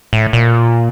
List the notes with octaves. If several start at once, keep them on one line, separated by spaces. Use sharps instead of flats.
A2
A#2